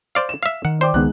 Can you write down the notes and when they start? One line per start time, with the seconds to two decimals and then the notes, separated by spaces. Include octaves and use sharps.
0.15 C5 D5 F5
0.29 E7
0.43 E5 F5
0.65 D#3 F#5
0.81 C5 D5 G5 D6
0.94 C#2 D#3 G#3 B3 D#4 F#6